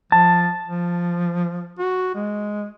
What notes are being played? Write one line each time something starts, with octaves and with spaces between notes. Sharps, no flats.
F3 A5
F3
F#4
G#3